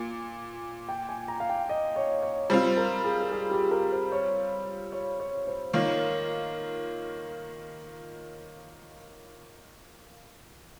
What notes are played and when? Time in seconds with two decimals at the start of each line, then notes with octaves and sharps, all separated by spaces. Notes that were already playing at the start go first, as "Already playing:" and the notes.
Already playing: A#2
0.89 G5
1.09 G#5
1.28 A#5
1.40 F5
1.49 G5
1.69 D#5
1.96 C#5
2.23 C#5
2.49 G3 C4 F4 C5
2.77 A#4
3.04 G#4
3.21 A#4
3.31 G#4
3.51 G4
3.71 A#4
3.92 C5
4.12 C#5
4.92 C#5
5.20 C#5
5.47 C5
5.74 D#3 A#3 F4 C#5